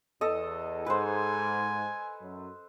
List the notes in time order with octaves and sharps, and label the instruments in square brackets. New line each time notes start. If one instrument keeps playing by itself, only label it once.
[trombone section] E2 [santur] A4 D#5
[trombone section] G#2 [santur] B4 C5 [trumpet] G#5
[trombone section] F#2